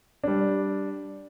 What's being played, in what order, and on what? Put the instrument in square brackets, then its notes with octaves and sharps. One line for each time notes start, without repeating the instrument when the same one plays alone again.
[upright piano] G3 D4